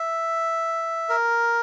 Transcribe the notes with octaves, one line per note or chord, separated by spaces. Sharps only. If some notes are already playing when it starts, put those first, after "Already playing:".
Already playing: E5
A#4